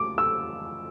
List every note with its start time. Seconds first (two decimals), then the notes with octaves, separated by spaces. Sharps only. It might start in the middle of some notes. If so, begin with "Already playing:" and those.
Already playing: A3 D6
0.18 E6